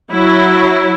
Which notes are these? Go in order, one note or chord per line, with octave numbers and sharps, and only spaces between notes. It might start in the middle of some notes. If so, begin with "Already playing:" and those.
F#3 E4